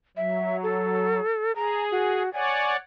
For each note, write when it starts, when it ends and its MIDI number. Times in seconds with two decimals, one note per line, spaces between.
0.17 1.20 54
0.17 0.57 76
0.63 1.55 69
1.56 2.23 68
1.56 1.84 82
1.91 2.32 66
2.33 2.76 73
2.33 2.76 74
2.33 2.76 78
2.33 2.72 80